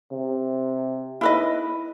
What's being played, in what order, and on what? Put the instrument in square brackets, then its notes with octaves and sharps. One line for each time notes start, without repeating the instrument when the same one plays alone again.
[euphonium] C3
[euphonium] D#4 [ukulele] E4 B4 D#5